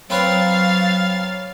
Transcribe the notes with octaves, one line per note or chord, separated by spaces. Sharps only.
F#3 C4 B4 C#5 F5 A6